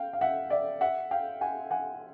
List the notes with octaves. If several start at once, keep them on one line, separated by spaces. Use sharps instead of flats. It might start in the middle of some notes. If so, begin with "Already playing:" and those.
Already playing: F5 G5
F5
E5 F#5
D5 E5
E5 F#5
F5 G5
F#5 G#5
F#5 G#5